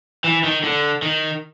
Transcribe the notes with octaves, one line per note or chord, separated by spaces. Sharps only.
E3
D#3
D3
D#3